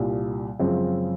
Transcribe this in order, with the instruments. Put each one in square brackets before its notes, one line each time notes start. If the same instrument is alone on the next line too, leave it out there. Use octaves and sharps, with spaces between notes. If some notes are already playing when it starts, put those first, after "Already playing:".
Already playing: [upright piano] C2 A#2 G3
F#2 C#3 F3 G#3 C4